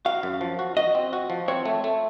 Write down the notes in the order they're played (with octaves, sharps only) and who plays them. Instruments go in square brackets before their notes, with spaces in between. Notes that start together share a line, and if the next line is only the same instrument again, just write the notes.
[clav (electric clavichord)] F#4 [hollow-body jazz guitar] F5
[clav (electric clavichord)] F#2
F3
F#4
[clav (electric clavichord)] F#4 [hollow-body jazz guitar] D#5
[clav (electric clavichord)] C4
F#4
F3
[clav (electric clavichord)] C4 [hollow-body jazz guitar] C#5
[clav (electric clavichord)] A3
A3